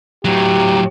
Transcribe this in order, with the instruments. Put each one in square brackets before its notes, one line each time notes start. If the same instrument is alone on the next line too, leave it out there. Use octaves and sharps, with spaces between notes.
[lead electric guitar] A2 F#3 [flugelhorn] G4